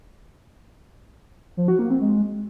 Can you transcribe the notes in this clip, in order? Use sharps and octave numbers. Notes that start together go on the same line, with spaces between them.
F3
F#4
A#3
C4
G#3